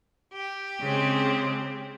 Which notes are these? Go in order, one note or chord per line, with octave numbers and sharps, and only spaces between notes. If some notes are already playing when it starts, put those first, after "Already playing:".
G4
C#3 G#3 C4